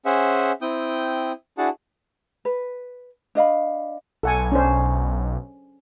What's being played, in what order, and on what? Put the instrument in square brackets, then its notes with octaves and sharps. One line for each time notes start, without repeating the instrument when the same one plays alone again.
[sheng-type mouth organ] C#4 G#4 C5 E5 F#5
C4 E4 G5 D#6 G6
D4 E4 F#4 G#4 F#5 A5
[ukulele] B4
D4 D#5 F5 B5
[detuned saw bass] B1 [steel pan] A4 F#5 G#5
[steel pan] C#4 D4 C5